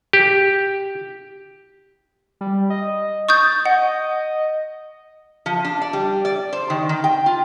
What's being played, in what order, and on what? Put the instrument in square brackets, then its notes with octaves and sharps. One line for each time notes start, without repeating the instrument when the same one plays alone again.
[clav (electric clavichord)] G4
[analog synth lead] G3
D#5
[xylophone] C#6 D#6 G6 [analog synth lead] A6
[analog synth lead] D#5 [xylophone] F#5
[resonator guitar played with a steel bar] F3
D4
D5
G3
D5
C5
D#3
D#3
G5
F4